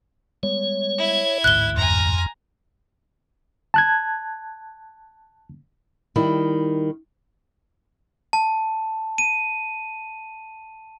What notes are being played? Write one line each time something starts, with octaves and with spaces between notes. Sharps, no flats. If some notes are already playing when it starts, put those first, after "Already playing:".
G3 G#3 B3 C#5
E4 G#6
A1 D2 G#2 F#6 G7
F2 G#5 A#5
A5 F#6 G#6
D#3 G3 E4
A5
D#7